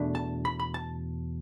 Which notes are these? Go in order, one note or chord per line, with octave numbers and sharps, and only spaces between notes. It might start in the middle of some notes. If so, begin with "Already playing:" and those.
Already playing: E2 B2 A3 D4
A5
B5
B5
A5